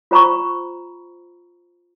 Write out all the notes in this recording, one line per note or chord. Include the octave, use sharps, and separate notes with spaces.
F4 C5 A#5 B5 C#6